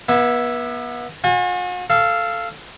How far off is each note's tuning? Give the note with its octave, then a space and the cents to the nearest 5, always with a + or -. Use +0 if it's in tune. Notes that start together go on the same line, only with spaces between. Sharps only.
B3 -30 E4 +0
F#4 -45 G#5 -40
A4 +0 F5 -15